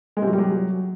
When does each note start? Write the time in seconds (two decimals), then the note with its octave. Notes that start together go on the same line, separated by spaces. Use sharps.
0.17 G#3
0.22 C3
0.28 F#3
0.33 G3
0.38 F#3